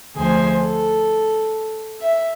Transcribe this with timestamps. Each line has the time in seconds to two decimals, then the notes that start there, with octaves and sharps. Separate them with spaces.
0.16 D2 F3 G#4 C5 G#5
0.60 A4
2.00 E5